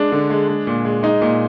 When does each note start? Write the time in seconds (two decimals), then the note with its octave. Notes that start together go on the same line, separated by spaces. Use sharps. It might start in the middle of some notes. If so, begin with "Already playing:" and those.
Already playing: G#3 D4
0.12 D3
0.30 G#3
0.48 G#3
0.67 A#2
0.85 G#3
1.03 G#3 D#4
1.22 A#2